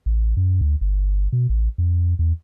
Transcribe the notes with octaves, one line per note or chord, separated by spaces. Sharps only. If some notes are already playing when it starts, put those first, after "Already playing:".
A1
F#2
D2
G1
B2
A1
F2
E2